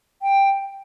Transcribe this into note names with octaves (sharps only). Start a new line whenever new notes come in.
G5